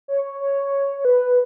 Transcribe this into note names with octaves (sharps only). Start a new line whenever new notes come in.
C#5
C#5
C#5
C#5
B4